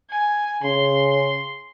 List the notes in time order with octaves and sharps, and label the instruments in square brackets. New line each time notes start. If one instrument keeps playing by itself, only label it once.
[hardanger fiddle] G#5
[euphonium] C#3 [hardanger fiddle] C6